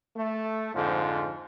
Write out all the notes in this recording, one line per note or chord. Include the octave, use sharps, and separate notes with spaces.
A3
F2 G#2 D3 F3